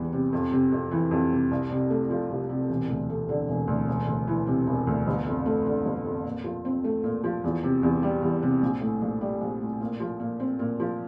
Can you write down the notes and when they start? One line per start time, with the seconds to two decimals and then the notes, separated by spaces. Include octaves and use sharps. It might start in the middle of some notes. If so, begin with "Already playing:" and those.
Already playing: E2 E3 G3
0.13 C3
0.33 F2
0.51 C3
0.72 F2
0.91 E3
1.11 F2
1.32 C3
1.51 C2
1.70 C3
1.90 A3
2.10 F3
2.30 C2
2.49 C3
2.69 E1
2.89 D2
3.09 A3
3.29 D3
3.49 E1
3.68 D2
3.88 E1
4.08 D2
4.27 E3
4.47 C3
4.67 E1
4.87 D2
5.07 G1
5.26 F2
5.46 A3
5.66 D3
5.86 G1
6.05 F2
6.25 A#2
6.44 F3
6.65 C4
6.84 A3
7.04 A#2
7.24 F3
7.44 E2
7.64 C3
7.83 E2
8.03 G3
8.22 E2
8.43 C3
8.62 A#1
8.81 A2
9.02 A#1
9.21 G3
9.41 A#1
9.61 A2
9.81 A#2
10.00 F3
10.20 A#2
10.40 C4
10.59 A#2
10.80 F3